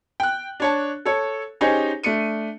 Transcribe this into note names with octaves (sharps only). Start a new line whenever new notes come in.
G5 F#6
D4 C#5 A5
A4 C#5
C#4 D#4 G4 G#4 C5 C#5
A3 D4 C#7 D#7